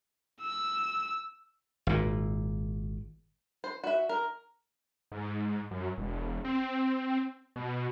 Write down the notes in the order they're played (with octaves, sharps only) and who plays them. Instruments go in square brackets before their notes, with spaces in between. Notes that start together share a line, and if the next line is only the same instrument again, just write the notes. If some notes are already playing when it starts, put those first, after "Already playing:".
[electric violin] E6
[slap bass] G#1 A#2
[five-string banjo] C5
F#4 E5
A#4
[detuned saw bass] G#2
F#2
E1
C4
B2